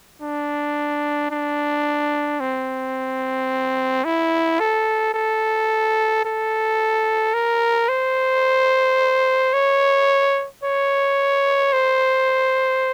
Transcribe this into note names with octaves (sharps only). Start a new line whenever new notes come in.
D4
D4
C4
E4
A4
A4
A4
A#4
C5
C#5
C#5
C5